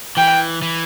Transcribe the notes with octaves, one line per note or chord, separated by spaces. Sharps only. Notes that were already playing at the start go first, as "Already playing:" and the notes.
E3 G5
E3